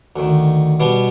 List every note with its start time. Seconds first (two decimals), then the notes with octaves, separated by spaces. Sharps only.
0.16 D2 D#3
0.80 B2 G3 B3